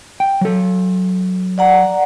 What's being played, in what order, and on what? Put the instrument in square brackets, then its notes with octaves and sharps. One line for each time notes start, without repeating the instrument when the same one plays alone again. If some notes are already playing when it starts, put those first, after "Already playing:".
[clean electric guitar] G5
F#3 A4
[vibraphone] D5 F#5 A#5